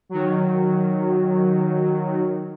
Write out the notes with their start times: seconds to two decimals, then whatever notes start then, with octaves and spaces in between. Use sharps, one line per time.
0.09 D#3 F#3